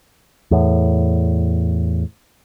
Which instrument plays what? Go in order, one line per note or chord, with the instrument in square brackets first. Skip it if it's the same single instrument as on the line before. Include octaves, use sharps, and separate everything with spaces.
[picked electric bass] E2 A2